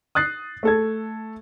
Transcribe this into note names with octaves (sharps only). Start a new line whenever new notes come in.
D#6 F#6 A6 C7
A3 A4 G#6